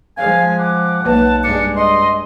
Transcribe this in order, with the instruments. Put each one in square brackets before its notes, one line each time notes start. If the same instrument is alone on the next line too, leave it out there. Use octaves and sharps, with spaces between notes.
[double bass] F3 G#3 [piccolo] F5 [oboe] G#5
[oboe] F#5 [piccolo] D6
[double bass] B1 [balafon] A#3 B4 [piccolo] A5
[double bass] G2 G#3 [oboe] D4 [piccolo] C#7
[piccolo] D#5 [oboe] C6